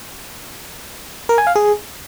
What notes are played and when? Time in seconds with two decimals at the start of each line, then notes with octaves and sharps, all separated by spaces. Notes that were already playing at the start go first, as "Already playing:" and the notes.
1.29 A#4
1.38 G#5
1.47 F5
1.55 G#4